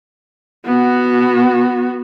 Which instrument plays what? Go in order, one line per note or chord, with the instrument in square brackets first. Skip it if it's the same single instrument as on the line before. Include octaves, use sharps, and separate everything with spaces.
[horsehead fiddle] B3 F#4